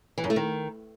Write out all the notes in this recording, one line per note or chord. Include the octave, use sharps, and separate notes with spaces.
E3
F#2
A3
D#3